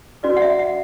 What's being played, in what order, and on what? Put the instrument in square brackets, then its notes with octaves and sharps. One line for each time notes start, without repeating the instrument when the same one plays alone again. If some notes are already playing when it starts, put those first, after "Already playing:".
[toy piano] C#4 F#4 B4 D5
F#5
E5
F#5